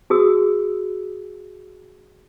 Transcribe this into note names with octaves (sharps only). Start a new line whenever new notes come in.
F#4 G#4 D#6 E6